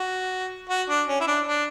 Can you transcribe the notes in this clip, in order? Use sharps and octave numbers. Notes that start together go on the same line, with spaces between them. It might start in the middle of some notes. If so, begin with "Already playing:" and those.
Already playing: F#4
F#4
D4
C#4
E4
D4
D4